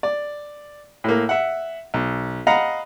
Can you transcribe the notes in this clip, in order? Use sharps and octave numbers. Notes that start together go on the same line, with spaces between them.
D5
A2 A#3
E5 F#5
B1
D#5 F5 F#5 A#5 B5